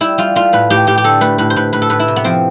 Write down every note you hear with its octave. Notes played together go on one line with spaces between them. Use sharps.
G3 E4
G3 F4
A3 F4
A2 B4
A2 G4
A2 G4
G4
D3 A4
A3 B4
A2 B4
C5
A2 B4
A2 B4
A4
A2 B4
E4
C3
B3
F3 C4